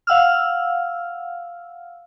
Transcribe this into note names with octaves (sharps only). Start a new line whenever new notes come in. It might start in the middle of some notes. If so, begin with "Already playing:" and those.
F5 F#5 E6 F6